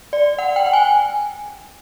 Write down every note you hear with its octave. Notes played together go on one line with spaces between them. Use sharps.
D5
F#5
G5
G5
G#5